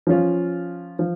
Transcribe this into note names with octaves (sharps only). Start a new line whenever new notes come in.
F3 C#4 F4
F3